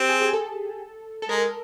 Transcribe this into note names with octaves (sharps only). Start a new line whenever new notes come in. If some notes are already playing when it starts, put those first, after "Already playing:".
Already playing: C4 G4
G#4
G#4
A4
A4
G#3 A#4